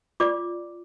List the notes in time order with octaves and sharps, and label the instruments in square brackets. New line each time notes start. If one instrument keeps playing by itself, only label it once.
[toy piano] F4 D5 D6